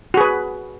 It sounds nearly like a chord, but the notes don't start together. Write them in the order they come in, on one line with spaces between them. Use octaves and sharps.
F#4 G#4 B4